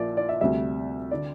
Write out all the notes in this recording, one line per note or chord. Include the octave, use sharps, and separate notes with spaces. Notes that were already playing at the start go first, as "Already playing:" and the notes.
Already playing: A#1 A#2 F3 D5 E5
D5
E5
D2 C3 G3 E5
D3 D5